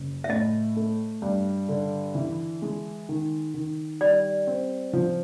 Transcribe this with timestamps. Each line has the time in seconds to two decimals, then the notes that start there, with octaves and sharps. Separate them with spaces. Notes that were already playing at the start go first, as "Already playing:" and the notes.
Already playing: F#1
0.24 E5
0.29 A2 D#5
0.76 A3
1.22 G2
1.69 D3
2.15 E3
2.62 G#3
3.09 D#3
3.54 D#3
4.01 G3 D5
4.47 C4
4.93 F3